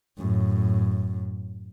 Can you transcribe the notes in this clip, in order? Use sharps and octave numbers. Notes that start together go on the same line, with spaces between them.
F#2 A2